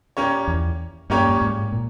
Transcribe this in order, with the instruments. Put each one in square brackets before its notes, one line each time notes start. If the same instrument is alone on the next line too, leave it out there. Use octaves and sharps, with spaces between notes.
[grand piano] A#2 A#3 C#4 G4 C#5
[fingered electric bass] E2
[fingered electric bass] G2 [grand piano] A#2 A#3 C#4 G4 C#5
[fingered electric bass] G2
G#2
A#2